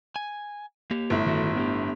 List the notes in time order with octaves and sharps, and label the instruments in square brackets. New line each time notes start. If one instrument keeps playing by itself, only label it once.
[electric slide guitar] G#5
A#3 G4
[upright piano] G1 A2
[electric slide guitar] D#3 F#4 A4
B3 D4 G4